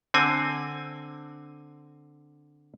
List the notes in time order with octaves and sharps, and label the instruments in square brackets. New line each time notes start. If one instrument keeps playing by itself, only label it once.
[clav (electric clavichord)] D3 C4 G#5